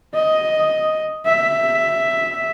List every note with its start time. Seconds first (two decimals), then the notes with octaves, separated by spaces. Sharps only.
0.15 D#5
1.26 E5